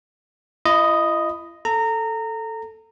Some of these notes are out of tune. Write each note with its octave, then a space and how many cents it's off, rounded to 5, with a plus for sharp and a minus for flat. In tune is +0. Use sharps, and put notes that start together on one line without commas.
E4 +45 D#5 +0 B5 +10
A4 +0 A#5 -20